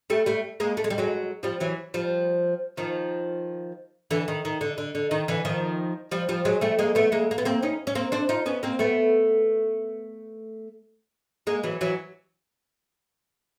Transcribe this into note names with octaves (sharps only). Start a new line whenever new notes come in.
G3 A3
G3 A3
G#3 A#3
A3
G#3
G3
F#3 G#3
F3 G3
E3 F#3
F3 G3
D#3 F3
D3 E3
D#3
D#3
D3
D3
D3
D#3
D3 E3
D#3 F3
F3 G3
F3 G3
F#3 G#3
G3 A3
G#3 A#3
A3 B3
G#3 A#3
A#3
B3
A#3 C4
C#4 D#4
C#4
A#3 C4
C4 D4
D#4 F4
B3 C#4
A#3 C4
A3 B3
G#3 A#3
E3 F#3
E3 F#3